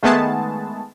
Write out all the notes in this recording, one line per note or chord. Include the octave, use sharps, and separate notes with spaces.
D#3 G#3 A3 B3 G#4 A5